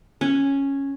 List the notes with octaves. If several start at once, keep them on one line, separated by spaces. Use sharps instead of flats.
C#4